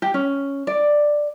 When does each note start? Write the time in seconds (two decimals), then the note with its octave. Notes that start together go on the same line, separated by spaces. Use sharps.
0.02 G4
0.14 C#4
0.67 D5